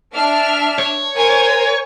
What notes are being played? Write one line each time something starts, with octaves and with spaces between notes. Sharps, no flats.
D4 E5 F6
C#5
A#4 C5 G#5